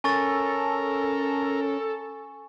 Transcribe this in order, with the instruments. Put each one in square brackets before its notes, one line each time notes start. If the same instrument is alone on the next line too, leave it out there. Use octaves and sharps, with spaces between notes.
[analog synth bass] C#4 [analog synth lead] A4 [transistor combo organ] A#4 [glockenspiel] G#5 C#6 A6